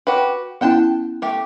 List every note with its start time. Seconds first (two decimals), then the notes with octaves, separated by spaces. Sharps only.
0.07 F#4 G4 B4
0.61 B3 C#4 E4 F#5 G5 A5
1.22 A3 G4